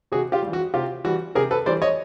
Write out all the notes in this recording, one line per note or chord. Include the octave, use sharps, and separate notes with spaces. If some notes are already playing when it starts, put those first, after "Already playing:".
C3 F#4 G#4
F4 G4
G3
E3
F#4
C3 F4 G4
E3 G3 F#4
C3 G#4 A#4
A4 B4
E3 G3 C5 D5
C#5 D#5